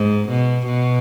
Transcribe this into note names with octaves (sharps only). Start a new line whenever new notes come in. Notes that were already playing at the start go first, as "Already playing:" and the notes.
Already playing: G#2
B2
B2